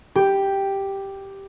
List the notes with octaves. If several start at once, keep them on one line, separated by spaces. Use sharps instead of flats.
G4